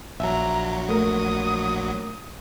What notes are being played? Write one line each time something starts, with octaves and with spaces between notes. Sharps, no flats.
A#1 F#3 E5 A#5
A3 A#4 D#6